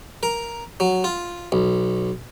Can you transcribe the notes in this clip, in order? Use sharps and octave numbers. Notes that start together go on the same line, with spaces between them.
A#4
F#3
F4
B1